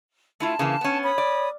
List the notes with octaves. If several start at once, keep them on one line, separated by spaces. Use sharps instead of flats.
A3 E4 F4 A5
C#3 E3 A#3
B3 C#4
C#5 B5 D#6
D5